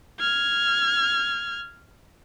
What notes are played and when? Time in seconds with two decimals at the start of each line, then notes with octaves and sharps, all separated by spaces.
0.20 F6 G#6